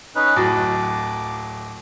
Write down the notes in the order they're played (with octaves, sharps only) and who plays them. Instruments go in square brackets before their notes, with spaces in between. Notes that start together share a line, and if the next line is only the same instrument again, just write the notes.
[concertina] C#4 D#4 B4
[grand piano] D1 F#3 A6 [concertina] D6